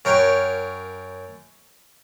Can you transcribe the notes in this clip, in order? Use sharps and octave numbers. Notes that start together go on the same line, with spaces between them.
F#2 A#4 C#5 G5